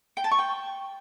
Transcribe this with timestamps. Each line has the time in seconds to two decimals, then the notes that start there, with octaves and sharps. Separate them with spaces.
0.17 G5
0.24 A5
0.31 C#6
0.39 G5